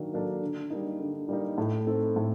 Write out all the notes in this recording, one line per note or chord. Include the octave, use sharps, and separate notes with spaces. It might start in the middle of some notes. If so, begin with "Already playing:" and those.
Already playing: D#3 F#3 A#3 D4
F#3 A#3 D4 A4
D3
G3 A#3 D#4
D3
G3 A#3 D#4
A2
A3 C4 D#4 A4
A2